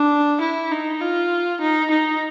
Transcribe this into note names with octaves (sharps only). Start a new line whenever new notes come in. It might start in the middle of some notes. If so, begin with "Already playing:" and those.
Already playing: D4
E4
D#4
F4
D#4
D#4